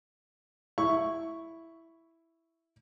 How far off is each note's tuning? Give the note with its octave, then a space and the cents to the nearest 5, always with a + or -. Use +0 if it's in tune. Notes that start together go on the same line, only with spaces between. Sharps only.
E4 +0 C#6 +0